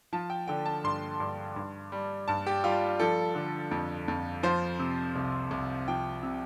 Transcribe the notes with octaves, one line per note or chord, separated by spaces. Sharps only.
F3 A5
G5
D3 G5
A5
G2 C6
G2
G2
G3
G2 A5
G4
G3 F4
F3 A4
D3
F2
F2
F3 C5
C3
C2
C2
F3 G5
C3